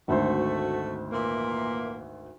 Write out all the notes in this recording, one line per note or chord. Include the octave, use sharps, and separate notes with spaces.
G#1 D2 A3 F#4 C5
A#2 E3 A#3